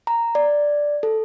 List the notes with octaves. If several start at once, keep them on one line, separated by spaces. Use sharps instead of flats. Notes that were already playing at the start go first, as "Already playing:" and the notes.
A#5
D5
A4